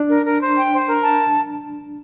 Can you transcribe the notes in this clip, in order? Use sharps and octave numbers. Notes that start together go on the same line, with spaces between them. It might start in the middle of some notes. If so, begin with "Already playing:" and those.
Already playing: D4
A#4
A#4
C5
G5
C5
A#4
A5